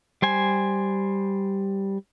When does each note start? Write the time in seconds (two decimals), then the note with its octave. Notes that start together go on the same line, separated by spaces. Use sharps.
0.22 G3 C5 G#5